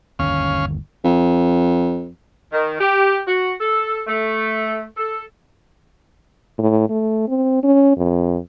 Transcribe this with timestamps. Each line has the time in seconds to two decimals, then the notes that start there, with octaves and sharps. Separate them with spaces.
0.19 G1 D#2 C#4 F5
1.04 F2
2.52 D#3
2.79 G4
3.26 F#4
3.60 A4
4.07 A3
4.97 A4
6.59 A2
6.89 A3
7.28 C4
7.63 C#4
7.97 F2